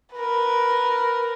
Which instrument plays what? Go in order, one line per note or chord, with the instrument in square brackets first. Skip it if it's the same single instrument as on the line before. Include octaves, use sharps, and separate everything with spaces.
[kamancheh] A#4 B4